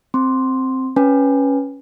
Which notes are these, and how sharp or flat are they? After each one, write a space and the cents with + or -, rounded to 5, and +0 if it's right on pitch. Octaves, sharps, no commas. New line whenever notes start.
C4 +0 C6 +0
C#4 +0 B4 -5 G#5 +0